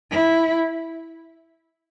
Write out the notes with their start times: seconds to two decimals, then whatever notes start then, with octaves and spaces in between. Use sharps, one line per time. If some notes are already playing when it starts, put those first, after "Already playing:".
0.11 E4